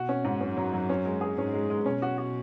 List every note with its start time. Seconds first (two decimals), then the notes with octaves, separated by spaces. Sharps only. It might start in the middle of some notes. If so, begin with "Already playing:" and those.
Already playing: B2 F#4
0.09 C#4
0.25 G#2
0.41 F#2 C#4
0.57 F#3
0.73 F#3
0.89 C#4
1.05 G#3
1.21 G#4
1.37 G#2 C#4
1.54 G#3
1.70 G#3
1.86 B2 C#4
2.02 F#4
2.18 F#4